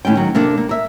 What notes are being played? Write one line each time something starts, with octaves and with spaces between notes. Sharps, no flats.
D#2 A2 C#4 G5
D#3 F#3
C3 A#3 D4 A4
A#3
A#4 E5